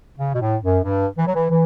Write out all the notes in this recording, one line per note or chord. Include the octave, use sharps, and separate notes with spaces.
C#3
B2
A2
F#2
G2
E3
F#3
E3
E3